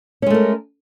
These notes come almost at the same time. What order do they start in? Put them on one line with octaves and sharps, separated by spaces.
C#4 G#3 A3 A#4